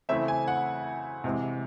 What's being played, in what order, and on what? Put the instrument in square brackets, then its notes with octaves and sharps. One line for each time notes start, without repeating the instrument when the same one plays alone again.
[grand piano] C#3 E3 A3 C4 E4 E5
G#5
F#5
C3 E3 G#3